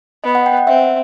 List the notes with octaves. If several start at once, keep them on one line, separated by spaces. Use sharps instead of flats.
B3 D#5
F#5
G5
F#5
C4 E5
E5